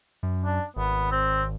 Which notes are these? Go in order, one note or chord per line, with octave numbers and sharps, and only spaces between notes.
F#2
D4
G#1 B3
C4